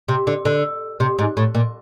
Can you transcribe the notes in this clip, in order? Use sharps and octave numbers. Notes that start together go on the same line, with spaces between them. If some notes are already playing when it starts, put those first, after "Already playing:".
C3
D3
D3
C3
G#2
A2
A#2